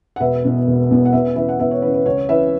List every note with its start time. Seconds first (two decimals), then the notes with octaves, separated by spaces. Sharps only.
0.16 F#5
0.20 E1 B4 E5
0.44 E2 B2 B3
0.67 E1
0.90 E2 B2 B3
1.05 F#5
1.13 E2 B4 E5
1.36 C#3 E3 B4 E5
1.49 F#5
1.59 E2 B4 E5
1.71 C#5
1.82 C#3 E3 B4
1.94 B4
2.05 C#2 C#5
2.29 C#3 E3 C#4 B4 E5